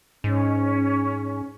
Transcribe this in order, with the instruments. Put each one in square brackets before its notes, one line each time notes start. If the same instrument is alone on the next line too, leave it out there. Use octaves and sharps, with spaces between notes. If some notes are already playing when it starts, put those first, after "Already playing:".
[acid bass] G#2 [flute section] C#4